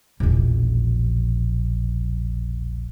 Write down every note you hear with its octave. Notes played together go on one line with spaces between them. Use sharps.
E1 A#1